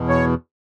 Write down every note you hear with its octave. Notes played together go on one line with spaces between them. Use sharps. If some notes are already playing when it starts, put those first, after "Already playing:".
Already playing: E2 B2
C#5